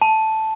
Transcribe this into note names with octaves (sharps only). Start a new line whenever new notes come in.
A5